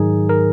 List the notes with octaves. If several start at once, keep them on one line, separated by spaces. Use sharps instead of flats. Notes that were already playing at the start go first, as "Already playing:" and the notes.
Already playing: G#2 D#3 F#3 D#4 G#4
A#4